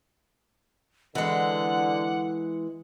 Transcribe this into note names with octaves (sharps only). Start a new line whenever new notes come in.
D3 E3 G#3 F#5